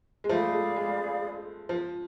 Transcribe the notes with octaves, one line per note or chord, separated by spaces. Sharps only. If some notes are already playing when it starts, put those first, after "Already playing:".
G#3
F3 A3 G#4 D5 F5 B5
A3
G#3
G#3
F3